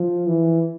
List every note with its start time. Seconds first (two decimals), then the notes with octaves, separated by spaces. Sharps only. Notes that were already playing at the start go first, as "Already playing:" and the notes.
Already playing: F3
0.27 E3